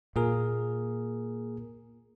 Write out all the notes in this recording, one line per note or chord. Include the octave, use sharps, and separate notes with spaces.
A#2 A#3 G#4 A#4